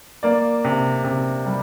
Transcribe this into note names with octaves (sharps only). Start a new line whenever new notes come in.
A#3 D5
C3
C3
G3